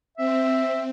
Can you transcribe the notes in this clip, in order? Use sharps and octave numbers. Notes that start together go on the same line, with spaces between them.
C4 E5